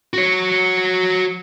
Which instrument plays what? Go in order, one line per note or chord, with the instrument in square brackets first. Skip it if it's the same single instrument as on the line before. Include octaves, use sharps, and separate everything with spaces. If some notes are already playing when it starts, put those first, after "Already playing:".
[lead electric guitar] F#4 C#5